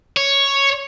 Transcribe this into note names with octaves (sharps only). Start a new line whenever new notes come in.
C#5